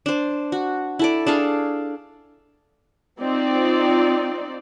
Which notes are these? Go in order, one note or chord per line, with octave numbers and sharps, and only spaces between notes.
D4 C5
F#4
E4 A4 D5
D4 G#4 A4 F5
C4 D#4 F4 D5